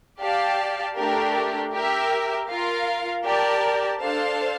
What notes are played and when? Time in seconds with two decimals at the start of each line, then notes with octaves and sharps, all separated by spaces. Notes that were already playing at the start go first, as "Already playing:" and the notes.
0.21 G4 D5 F5 A5
0.97 A3 D4 G4 A#4
1.74 G4 A#4 E5
2.48 F4 A#4 F5
3.24 G4 A#4 D5 A5
4.00 D4 A4 C5 F5 A5